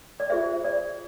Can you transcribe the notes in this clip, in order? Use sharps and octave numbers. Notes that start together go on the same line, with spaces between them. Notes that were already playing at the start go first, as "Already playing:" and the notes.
D5
F4 G#4 C5 E5
D5